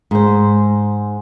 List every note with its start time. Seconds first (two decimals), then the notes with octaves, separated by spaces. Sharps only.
0.11 G#2 C5